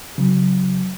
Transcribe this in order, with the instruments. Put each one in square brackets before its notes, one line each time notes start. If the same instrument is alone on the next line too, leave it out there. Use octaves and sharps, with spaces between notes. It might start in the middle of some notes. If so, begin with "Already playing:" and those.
[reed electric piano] C#3 F#3